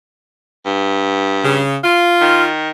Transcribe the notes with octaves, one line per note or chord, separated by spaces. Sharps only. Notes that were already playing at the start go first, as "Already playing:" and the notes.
G2
C#3
F4
D#3